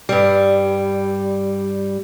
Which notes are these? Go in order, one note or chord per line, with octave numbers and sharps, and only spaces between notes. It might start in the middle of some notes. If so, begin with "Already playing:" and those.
G2 G3